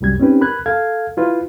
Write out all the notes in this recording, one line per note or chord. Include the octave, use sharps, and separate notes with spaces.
C2 F#2 G3 G#6
C4 C#4 D#4 G4 B4
A#4 B5 F#6 G#6
A4 F5 G#6
E4 F4 B4